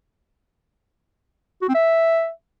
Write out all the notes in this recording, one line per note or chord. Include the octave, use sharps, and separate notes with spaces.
F#4
C4
E5